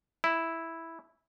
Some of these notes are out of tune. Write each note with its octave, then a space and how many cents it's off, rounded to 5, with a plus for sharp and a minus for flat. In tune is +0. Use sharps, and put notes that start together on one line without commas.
E4 -5